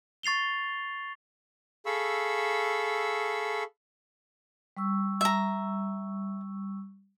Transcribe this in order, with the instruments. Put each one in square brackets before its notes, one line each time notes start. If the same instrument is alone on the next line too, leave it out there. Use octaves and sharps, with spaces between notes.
[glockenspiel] C#6 A6 C7 F7 G7
[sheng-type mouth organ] G#4 A4 F5 B5 C#6 E6
[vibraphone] G3 C#6 E6
[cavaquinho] E5 A#5